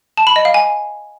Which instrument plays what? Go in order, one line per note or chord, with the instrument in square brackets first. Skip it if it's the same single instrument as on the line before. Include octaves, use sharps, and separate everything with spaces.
[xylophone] A5
B5
D#5
F5
G#5